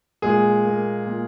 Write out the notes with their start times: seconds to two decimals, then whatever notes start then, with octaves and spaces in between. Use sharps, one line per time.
0.22 A#2 G#3 G#4
0.65 A#3
1.06 A#2